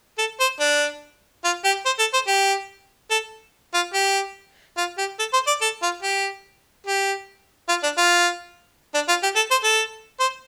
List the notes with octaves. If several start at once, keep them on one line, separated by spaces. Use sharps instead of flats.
A4
C5
D4
F4
G4
C5
A4
C5
G4
A4
F4
G4
F4
G4
A4
C5
D5
A4
F4
G4
G4
F4
D4
F4
D4
F4
G4
A4
C5
A4
C5